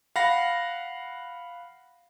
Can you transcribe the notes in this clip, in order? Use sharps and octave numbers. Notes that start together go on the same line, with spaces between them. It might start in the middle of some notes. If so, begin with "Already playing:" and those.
F5 F#5 B5 A#6